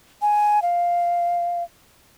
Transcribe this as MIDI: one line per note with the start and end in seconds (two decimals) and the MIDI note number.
0.22 0.62 80
0.62 1.63 77